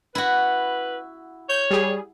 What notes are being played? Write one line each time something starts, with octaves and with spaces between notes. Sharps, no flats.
E4 F#4 B4
C#5 G6
G3 G#4